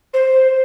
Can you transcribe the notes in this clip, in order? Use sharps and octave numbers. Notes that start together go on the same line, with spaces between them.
C5